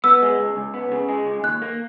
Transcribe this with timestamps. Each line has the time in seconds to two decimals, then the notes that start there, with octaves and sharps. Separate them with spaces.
0.04 B3 E6
0.22 G#3
0.39 C#2
0.57 C#2
0.74 B3
0.92 C#3
1.09 G#3
1.27 C#2
1.44 D#2 F#6
1.62 A#3